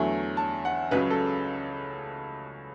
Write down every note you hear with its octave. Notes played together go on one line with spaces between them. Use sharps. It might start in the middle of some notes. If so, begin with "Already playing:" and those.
Already playing: E2 D3 F#3 A3
A5
F#5
C#2 C#3 F#3 B4
A4